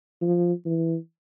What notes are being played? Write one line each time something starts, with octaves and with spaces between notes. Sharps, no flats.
F3
E3